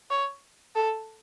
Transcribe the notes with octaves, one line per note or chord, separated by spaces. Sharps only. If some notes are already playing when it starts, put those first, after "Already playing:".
C#5
A4